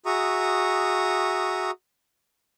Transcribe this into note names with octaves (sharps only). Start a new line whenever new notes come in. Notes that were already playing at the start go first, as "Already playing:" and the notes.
F#4 G#4 E5 A#5 C#6 D#6